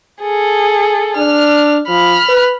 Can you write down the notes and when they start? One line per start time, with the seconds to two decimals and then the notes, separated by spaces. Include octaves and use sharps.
0.22 G#4 A4
1.17 D4 F6
1.88 F3 B5 F6
2.28 B4